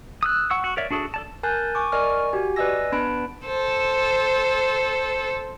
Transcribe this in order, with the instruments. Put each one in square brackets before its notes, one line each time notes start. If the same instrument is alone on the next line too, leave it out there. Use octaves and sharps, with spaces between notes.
[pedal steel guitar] D#6 E6 F#6
F#5 C#6 E6
F#4
A#4 C#5 D5 E5
D4 F#4 G#4 A4
A4 D5 A5
[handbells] A#4 G#5 A5 F#6 G6 A6
G#5 C#6 D6
A#4 D5 D#5 G#5 C#6 F6
F#4 G4 G#5
B4 D5 D#5 G#5 E6 A#6
B3 D4 B4 A5 B5 D7
[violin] A4 C5